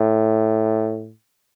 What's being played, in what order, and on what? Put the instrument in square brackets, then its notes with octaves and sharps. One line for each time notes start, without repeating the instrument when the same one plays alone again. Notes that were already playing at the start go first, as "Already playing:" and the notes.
Already playing: [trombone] A2